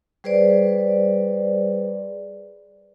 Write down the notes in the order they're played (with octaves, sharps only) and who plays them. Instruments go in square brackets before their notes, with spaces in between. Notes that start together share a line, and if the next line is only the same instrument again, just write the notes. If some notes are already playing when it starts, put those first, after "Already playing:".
[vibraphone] G3 G#4 B4 C5 D5